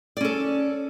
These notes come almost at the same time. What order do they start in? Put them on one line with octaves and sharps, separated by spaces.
D5 C#4 A4